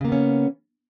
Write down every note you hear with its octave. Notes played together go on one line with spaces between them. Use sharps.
C#3 A#3 B3 C#4